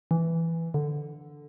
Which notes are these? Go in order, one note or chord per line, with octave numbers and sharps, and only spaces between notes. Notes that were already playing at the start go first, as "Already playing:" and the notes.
E3
D3